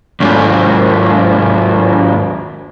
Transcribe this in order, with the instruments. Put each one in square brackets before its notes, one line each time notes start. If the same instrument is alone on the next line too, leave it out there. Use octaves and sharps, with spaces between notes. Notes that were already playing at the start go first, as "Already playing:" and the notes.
[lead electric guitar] D#2 G#2